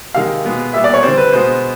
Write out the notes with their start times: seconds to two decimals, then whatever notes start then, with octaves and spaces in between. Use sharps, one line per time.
0.15 C3 D#3 G#3 F5
0.44 B2 G#3 B3
0.73 A#2 G3 B3 E5
0.84 D5
0.94 C#5
1.03 D3 G3 C4 C5
1.17 B4
1.33 B2 G#3 B3 C5